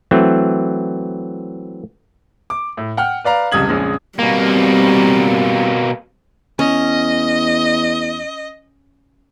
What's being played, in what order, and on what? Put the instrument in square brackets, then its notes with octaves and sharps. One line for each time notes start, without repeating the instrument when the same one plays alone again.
[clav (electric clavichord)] E3 F#3 A3 C4
[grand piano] D6
A2
F#5 G5 F6
B4 D5 F5 A#5
F1 C#2 G3 D#6 G#6 F#7
A#1 F2 C#3 G#3
[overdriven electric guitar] B2 A#3 [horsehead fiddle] G3 C4
[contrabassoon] E2 [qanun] C#4 [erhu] D#5